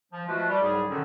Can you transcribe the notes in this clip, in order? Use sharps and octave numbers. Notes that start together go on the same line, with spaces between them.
F3
F3 G#3 A3 F4 F#4 B4
G3
C2 G#2 F#3 G3 G#4
B2 D3 D#3 F#3 C4 C#4